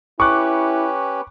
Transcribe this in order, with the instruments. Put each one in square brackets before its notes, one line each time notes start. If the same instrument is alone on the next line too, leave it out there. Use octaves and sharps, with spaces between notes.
[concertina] C#4 G4 B4 [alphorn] E4 [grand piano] C#6 D6 F#6